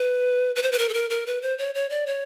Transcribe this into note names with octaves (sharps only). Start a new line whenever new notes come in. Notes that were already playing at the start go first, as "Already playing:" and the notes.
Already playing: B4
B4
C5
B4
A#4
A4
A#4
A#4
B4
C5
C#5
C#5
D5
C#5